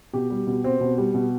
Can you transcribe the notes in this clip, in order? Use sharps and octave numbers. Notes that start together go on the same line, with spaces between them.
B2 G4
G3
B2
C4
B2
G3
B2